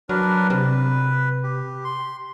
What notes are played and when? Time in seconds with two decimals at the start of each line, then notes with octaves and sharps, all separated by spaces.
0.09 F#3 D4 A#4 B4
0.50 C3 B4
1.43 G4
1.84 C6